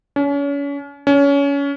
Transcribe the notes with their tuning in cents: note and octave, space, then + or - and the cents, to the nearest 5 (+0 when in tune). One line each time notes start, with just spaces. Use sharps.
C#4 +35
C#4 +25